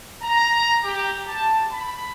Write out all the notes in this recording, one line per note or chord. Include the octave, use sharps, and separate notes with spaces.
A#5
G4
A5
B5